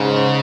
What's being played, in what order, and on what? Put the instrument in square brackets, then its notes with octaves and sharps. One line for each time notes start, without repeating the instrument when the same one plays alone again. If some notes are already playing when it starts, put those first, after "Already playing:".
Already playing: [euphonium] G#2 [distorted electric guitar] C#3